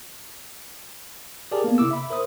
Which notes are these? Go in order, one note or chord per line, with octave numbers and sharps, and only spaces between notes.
G4 G#4 A#4 D5 A5
A#3 B3
C3 E4 D6 E6
E5 B5
A#4 C5 D#6